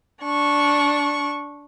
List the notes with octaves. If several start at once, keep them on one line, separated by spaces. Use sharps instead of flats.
D4 C#6